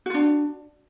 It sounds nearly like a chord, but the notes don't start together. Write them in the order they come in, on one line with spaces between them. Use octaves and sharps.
F#4 F4 D4